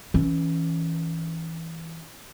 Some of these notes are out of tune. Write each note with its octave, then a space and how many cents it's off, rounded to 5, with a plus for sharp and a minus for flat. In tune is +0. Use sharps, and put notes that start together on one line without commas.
E3 -10 C#4 +0